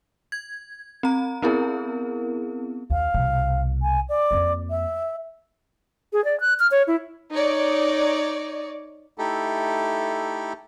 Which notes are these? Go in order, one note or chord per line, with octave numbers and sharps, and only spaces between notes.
G#6
C4 A#5
B3 C4 E4 G#4 A#4
D#2 F5
C2 B2
G#5
D5
F2 A#3
E5
G#4
D5
F#6
F6
C#5
E4
D#4 C#5 D5
A3 D#4 E4 G4 A4